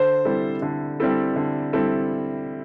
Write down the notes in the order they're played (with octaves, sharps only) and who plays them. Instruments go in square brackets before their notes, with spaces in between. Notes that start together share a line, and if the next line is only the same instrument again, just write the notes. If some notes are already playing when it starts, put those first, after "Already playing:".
Already playing: [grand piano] D3 [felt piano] C5
[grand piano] G3 C4 E4 A4
D3
G3 C4 E4 A4
D3
G3 C4 E4 A4